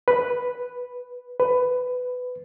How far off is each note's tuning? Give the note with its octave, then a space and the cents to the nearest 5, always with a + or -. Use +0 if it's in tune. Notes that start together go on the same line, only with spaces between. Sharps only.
B4 +0
B4 +15